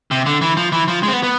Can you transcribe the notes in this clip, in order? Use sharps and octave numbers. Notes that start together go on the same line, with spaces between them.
C3
D3
E3
F3
E3
F3
G#3
C4
B3
B3